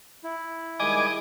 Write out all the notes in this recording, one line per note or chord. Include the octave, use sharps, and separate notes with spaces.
E4
D#3 G3 G#3 D#5 G#5 D6